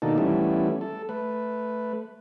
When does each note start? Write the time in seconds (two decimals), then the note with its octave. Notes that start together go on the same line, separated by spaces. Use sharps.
0.02 B2 D#3 A#3 D4 D#4 A4
0.18 E3 G3 A3 B3 C#4 E4
0.81 A4
1.09 A3 B4